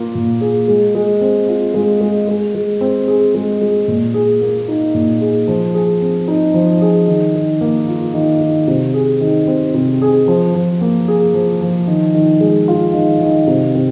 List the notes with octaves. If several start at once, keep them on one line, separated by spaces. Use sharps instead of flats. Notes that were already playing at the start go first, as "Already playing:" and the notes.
Already playing: A#2 A#3 F4
A#2
G#4
G#3
G#3
C4
F4
G#3
G#3
G#3
G#3
C4
G#4
G#3
G#3
A#2
G#4
A#3
D#4
A#2
G#4
F3
G#4
C4
D#4
F3
G#4
D#3
D#3
A#3
F4
D#3
D#3
C3
G#4
D#3
C4
C3
G#4
F3
F3
A#3
G#4
F3
F3
D#3
D#3
G#3
F4
D#3
D#3
C3
C3